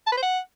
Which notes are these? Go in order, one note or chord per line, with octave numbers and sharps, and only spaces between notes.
A5
B4
C5
F#5